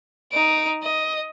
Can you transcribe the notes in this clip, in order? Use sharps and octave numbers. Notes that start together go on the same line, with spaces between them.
D#4 D7
D#5